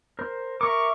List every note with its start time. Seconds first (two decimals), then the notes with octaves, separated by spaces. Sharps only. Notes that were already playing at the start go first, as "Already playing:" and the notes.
0.19 A#4 C5
0.61 A#4 E5 C#6 D6